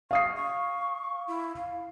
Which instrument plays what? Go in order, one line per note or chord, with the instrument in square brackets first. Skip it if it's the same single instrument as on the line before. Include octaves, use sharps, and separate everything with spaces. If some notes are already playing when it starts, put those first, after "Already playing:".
[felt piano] F5 D#6 C7 [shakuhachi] C#6
[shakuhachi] C#6
E4
F5